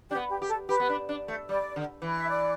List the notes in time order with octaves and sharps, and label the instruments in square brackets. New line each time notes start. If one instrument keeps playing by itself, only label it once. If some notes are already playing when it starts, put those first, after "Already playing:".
[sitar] D4 [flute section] G4
[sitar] B3
[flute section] G4
[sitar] G4
[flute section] A4
[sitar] G4 [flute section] B4
[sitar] B3
D4
D4
A3
[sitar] G3 [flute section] D5
[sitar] D3
E3
[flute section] E5
D5